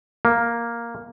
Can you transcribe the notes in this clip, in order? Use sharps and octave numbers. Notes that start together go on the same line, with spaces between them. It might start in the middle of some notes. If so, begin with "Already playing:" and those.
A#3